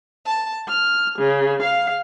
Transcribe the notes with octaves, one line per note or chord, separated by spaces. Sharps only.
A5
F6
C#3
F5